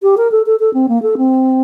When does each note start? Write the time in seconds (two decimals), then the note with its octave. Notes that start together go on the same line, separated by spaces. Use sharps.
0.02 G4
0.17 A#4
0.31 A4
0.46 A4
0.59 A4
0.73 C4
0.88 A#3
1.02 A4
1.17 C4